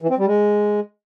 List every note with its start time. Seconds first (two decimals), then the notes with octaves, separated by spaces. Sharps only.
0.02 E3
0.10 C4
0.18 G3
0.26 G#3